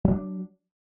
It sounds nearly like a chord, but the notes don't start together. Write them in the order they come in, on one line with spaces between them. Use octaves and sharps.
F#3 C#4 D4